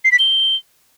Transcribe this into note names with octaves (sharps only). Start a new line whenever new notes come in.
C7
B6
G7